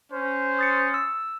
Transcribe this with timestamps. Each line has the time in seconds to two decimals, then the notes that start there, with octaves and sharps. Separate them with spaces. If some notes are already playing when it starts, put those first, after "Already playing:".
0.10 C#4 C5
0.59 D#6 A6 C#7
0.94 E6